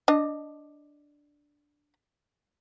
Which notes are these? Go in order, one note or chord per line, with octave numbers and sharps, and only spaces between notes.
D4 D#5